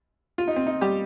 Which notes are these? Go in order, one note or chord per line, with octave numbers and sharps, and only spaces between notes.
F4
D#4
C4
D#4
G3 G4